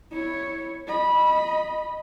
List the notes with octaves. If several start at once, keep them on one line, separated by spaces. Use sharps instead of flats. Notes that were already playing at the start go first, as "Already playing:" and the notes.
E4 C#5
D#5 B5